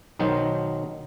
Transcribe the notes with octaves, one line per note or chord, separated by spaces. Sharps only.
B1 D#3 F#3 D#4 C5